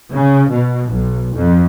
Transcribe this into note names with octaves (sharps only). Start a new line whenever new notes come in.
C#3
B2
B1
F2